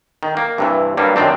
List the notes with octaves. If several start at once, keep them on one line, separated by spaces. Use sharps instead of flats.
D#3
A#3
G2 C3 E3
G2 F#3 G3 A#3
F#2 C3 D#3 C4 D4